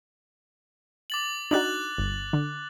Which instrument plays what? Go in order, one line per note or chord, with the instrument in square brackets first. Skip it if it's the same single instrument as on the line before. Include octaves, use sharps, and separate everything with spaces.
[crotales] D6 A6 F#7
[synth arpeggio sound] D4 D#4 F#4 [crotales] F#6 A6 F#7
[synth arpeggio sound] G1
D3